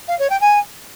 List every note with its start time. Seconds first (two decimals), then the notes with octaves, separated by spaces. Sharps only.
0.08 F5
0.19 C#5
0.29 G5
0.40 G#5